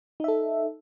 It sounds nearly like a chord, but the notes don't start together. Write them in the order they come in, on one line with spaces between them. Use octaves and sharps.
D#4 E5 A4